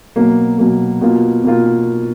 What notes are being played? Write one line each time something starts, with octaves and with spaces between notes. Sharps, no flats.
B2 F#3 A#3
B2 F#3 A#3
B2 A#3 F4
B2 A#3 F4